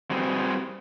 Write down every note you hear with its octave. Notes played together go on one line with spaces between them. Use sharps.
G3 C4 F#4 G#4 B4 C5